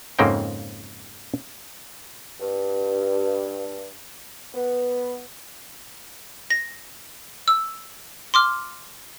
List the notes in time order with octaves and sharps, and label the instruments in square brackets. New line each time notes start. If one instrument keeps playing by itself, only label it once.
[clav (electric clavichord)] F2 G#2 C#3 A#3 C4 G5
[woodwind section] G2
B3
[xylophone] A#6
E6
C6 D6 F6